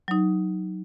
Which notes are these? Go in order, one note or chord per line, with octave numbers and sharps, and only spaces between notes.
F#3 D#4